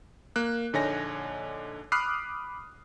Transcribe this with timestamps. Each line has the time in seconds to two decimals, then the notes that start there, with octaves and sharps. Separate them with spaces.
0.36 A#3 F#6
0.73 A#1 D3 D#4 C#5 G#5 A#6
1.92 B5 D6 D#6 F6 F#6 C7